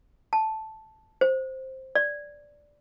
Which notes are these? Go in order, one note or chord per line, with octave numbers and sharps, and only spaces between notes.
A5
C5
D5